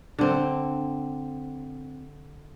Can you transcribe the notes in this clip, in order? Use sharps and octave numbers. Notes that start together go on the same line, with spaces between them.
D3 C4